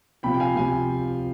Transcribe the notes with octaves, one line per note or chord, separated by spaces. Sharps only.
C3 F3 G5 B5
G5
F5 G#5
C3 F3 F5 G#5